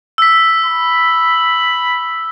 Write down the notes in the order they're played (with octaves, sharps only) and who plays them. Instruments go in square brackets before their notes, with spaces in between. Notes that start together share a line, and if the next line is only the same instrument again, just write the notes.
[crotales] E6 B6
[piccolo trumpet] B5